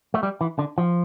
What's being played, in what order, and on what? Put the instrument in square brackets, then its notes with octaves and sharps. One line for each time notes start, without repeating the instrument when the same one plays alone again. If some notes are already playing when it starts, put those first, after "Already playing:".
[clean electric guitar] A3
G3
E3
D3
F3